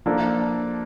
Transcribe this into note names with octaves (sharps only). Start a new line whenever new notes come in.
F3 A#3 D4 A4